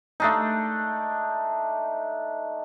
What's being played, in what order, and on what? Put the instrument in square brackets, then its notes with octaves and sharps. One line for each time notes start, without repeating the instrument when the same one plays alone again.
[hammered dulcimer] A3 D4 D#4